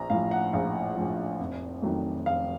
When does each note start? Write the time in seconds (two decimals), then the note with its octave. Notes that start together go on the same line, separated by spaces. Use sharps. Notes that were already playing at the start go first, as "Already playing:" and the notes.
Already playing: A#1 A#5
0.10 A2 F3 F5
0.31 F#5
0.53 A#1 F5
0.96 A2 F3
1.39 F1
1.82 F2 D#3 F#3 A3
2.26 F1 F5